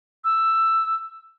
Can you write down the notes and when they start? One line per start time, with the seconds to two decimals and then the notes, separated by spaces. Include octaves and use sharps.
0.24 E6